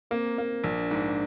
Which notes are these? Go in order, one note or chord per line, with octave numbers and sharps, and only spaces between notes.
A#3 C4
A#3
A#1 D4
G#2